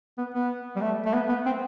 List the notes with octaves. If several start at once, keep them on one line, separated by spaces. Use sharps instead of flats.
B3
B3
G3
A3
A3
B3
B3
C4